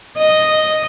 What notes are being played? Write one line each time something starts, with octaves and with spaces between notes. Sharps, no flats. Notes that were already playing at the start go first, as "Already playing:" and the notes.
D#5